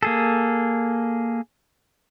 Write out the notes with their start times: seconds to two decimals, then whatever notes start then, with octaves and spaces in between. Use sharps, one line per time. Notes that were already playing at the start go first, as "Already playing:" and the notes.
0.03 A#3 G#4 A4